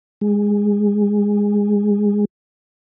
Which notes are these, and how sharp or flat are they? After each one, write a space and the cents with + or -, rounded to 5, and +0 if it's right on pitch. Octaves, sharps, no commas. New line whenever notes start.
G#3 -15